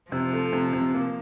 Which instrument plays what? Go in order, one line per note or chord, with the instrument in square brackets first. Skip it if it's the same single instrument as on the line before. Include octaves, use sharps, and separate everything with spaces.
[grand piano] C3 [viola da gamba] F3
[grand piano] A3
C3
C3
A#3